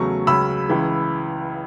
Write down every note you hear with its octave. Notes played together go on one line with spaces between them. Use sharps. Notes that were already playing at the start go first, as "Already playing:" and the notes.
Already playing: E2 C#3 F#3 A3 C#6
C#2 C#3 F#3 B5 E6
C#2 C#3 E3